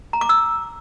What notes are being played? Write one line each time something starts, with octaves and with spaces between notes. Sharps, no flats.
A#5
D6
E6